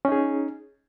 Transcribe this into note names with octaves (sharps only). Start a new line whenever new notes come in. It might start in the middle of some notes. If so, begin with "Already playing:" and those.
C#4 D#4 G#4